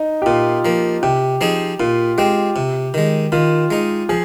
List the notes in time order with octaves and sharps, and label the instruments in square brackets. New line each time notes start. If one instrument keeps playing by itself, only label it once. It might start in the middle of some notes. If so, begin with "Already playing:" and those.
Already playing: [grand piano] D#4
G4
[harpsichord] A#2 [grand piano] F4
[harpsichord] F3 A#3
[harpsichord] C3 [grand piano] G4
[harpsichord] F3 C4 D#4 G#4
[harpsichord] A#2 [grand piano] F4
[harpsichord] G#3 C4 [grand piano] G4
[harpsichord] C3
D#3 G#3
[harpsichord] D#3 [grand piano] F4
[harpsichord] G#3 D#4
[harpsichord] F3 [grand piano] G#4